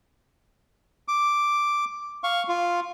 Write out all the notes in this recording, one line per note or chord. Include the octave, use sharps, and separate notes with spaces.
D6
F5 C#6
F4